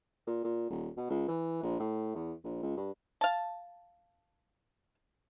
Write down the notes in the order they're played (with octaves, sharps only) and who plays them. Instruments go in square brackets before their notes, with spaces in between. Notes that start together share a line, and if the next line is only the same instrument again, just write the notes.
[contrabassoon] A#2
A#2
D#1
B2
C#2
E3
A#1
A2
E2
A#1
C#2
G2
[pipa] F5 A5